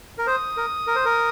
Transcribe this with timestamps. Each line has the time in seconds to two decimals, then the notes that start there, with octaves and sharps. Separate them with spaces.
0.18 A#4
0.27 C5 D#6
0.57 A#4
0.87 A#4
0.95 C5
1.05 A#4